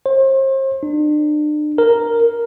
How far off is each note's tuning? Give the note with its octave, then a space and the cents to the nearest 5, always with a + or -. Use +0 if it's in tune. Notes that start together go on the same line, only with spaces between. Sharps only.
C5 +40
D4 +40
A#4 +0